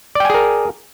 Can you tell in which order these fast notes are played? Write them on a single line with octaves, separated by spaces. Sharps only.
D5 G5 G#5 G#4 A#4